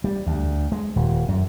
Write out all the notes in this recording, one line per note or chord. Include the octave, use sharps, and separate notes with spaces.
G3
D2
G#3
D#1
F#2